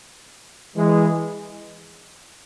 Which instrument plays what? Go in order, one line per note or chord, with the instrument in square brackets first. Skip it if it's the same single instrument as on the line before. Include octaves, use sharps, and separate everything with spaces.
[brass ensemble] E3 G#3